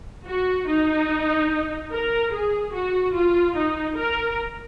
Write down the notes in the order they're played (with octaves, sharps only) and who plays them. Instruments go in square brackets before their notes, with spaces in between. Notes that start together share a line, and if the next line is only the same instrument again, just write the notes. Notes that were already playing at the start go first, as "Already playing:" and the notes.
[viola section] F#4
D#4
A#4
G#4
F#4
F4
D#4
A#4